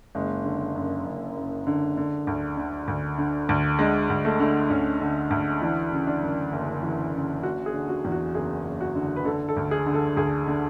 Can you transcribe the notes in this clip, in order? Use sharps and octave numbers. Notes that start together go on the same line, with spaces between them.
F#1 G#3
D3
F#2
F#1
F#1
D3
D3
D2
D3
D2
D3
D2
D3 G#3
D2
A3
D3
D2 C#4
D3
D2
E3 D4
C#3
D4
F#2
F#1
E3
C#3
F#1 F#4
G#4
D3
F#4
E2
F#4
F#1 G#4
F#1
F#4
D3
B4
D3 A4
A4
D2
G#4
D3
A4
D2 G#4
D3